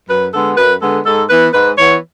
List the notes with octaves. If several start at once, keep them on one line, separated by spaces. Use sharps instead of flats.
F#2 B4
D3 G#3 B3 A4
F#2 B4
D3 G#3 B3 A4
G#2 A4
E3 B3 B4
G#2 B4
E3 B3 C#5